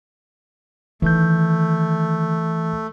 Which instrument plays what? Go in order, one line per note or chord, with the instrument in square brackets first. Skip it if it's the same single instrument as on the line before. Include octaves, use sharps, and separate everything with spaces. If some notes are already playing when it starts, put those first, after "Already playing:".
[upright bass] D#3 [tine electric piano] E3 G6 [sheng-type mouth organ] A3